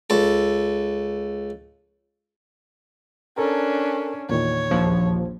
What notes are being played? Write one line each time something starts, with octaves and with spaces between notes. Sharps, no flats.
C#2 A4
C#4 D4 A4 A#4
E2 A#2 D#3 C#5
A#1 D#2 F3